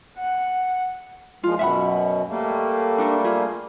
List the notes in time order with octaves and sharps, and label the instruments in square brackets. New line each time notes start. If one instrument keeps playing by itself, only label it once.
[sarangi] F#5
[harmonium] A#2 F3 G#3 [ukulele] F4
[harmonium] F#2 B2 [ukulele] E5 F#5 B5
[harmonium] G3 A3 A#3
[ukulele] D4 A4 A#4
F4 G#4 E5